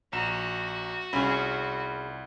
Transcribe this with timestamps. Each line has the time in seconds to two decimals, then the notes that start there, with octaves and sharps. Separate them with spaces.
0.13 A#1 F#4 A#5 E7
1.13 C2 C#4 F4 G#4 B5